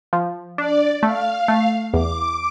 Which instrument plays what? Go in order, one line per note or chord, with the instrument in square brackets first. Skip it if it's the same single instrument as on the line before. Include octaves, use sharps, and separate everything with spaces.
[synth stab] F3
[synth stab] D4 [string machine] D5
[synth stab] A3 [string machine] F5
[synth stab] A3
[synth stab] E2 [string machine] D6